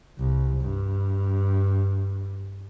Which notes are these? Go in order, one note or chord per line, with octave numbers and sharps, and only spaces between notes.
C2
G2